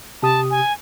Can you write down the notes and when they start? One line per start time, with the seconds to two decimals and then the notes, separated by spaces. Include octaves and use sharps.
0.23 C3 G4 A5 D#6
0.51 G#5